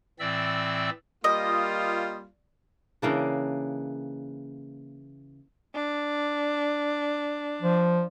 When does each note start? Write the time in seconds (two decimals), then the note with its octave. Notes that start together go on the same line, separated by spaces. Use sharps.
0.20 A2 E3 C4 D5 E5 E6
1.24 G3 A#3 F4 D#5
3.02 C#3 E3 A#3 D4
5.75 D4
7.62 F3